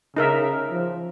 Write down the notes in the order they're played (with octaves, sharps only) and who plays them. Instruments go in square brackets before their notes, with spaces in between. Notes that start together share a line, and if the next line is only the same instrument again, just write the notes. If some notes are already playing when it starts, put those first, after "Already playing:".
[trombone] C#3 [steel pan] D#4 A#4 E5
[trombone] F3